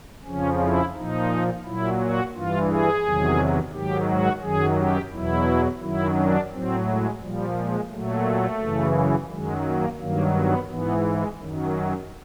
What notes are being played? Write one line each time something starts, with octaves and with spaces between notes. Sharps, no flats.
F2 C#3 F3 C#4
E4
A#2 F3 D#4
A#2 F#3 E4
F#4
G2 E3 F4
G#4
E2 C3 D#3 F#3
G#2 D#3 F#3 G4
F#4
F#2 D#3 F#3 G#4
G4
E2 B2 F#3 E4
F#2 D#3 F#3 E4
D4
A2 F#3 C4
G#3
A#2 F3 G3
G#3
A#2 F#3 A3
F#2 C#3 E3
F#2 D#3 F#3 G#3
A#3
G2 D#3 F#3 A#3
B3
G#2 E3 B3
G#3
F#2 D#3 F#3